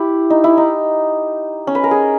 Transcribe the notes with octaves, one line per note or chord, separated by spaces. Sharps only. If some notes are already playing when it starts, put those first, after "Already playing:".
Already playing: E4 G4
D#4
E4
D#4
C#4
B4
A#4
G#4